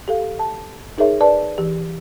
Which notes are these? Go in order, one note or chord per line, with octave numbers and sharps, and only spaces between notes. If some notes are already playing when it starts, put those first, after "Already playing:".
G4 A4 F5
A5
D#4 G#4 A#4 C#5 E5
B4 D5 A5
E3 G4